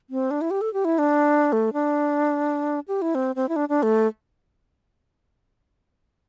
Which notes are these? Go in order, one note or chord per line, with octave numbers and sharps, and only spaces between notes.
C4
D4
E4
G4
A4
G4
E4
D4
A3
D4
G4
E4
C4
C4
E4
D4
D4
A3